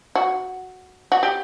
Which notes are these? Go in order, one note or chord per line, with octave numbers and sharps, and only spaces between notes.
F#4
F#4
G4